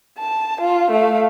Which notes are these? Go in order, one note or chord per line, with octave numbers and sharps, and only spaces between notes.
A5
F4
A3 F5